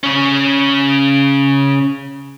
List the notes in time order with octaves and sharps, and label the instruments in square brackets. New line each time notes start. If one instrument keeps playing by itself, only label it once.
[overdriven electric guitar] C#3 C#4